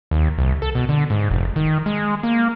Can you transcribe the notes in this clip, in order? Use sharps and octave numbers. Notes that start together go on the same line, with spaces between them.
D#2
C2
A4
B2
D3
G#2
F1
D#3
G#3
A#3